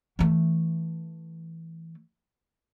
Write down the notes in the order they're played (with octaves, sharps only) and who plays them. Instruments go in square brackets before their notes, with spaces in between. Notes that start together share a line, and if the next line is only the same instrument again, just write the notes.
[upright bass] E3 A3